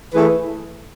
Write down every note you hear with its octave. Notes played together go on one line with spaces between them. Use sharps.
E3 A3 E4 G#4 B4